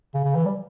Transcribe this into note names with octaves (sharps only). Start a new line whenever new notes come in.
C#3
C#3
E3
G3